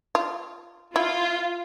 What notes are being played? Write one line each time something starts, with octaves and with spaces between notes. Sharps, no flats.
F4
E4 F4